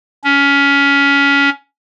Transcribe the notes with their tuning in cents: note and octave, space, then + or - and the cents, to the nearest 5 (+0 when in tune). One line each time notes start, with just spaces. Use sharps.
C#4 +20